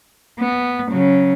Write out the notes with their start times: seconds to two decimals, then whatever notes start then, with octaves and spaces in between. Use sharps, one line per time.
0.39 B3
0.90 C#3 F#3